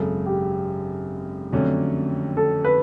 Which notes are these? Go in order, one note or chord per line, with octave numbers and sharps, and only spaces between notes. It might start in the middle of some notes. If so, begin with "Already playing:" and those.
Already playing: G#1 F#2 C#3 A4
G4
F2 D3 F#3 A3 C#4
A4
B4